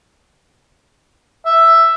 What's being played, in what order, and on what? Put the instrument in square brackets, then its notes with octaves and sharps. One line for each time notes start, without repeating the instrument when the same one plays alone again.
[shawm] E5